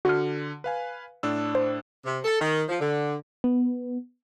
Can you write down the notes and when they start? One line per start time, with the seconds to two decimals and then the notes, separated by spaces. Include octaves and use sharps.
0.05 D3 F#4 F6
0.64 B4 F5 G#5
1.23 A2 D4 E6
1.55 C5
2.04 C3
2.25 A4
2.41 D#3
2.69 F3
2.80 D3
3.44 B3